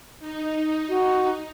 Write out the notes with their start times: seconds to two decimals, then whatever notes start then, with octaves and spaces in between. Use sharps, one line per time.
0.19 D#4
0.89 F#4